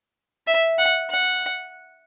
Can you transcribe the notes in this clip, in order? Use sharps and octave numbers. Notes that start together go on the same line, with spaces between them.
E5
F#5
F#5